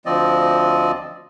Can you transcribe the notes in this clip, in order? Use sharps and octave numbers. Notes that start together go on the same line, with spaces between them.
D2 F3 C4 D5 D#5